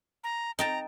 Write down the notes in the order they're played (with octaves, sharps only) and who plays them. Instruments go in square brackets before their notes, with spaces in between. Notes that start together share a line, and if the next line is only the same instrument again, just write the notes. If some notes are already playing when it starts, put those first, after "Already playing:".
[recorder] A#5
[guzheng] D#4 G5 A5 [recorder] A#5